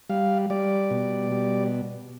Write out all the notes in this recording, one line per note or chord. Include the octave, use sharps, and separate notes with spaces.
G3 F5
G3 D5
B2
G3